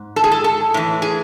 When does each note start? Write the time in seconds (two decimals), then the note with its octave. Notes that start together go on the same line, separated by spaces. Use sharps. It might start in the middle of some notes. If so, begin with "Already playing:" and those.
Already playing: G#2
0.16 A4
0.24 G#4
0.32 A4
0.44 A4
0.74 A2 E3
1.02 G#4